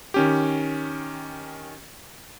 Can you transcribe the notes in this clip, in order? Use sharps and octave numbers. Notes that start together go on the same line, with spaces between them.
D#3 C#4 G4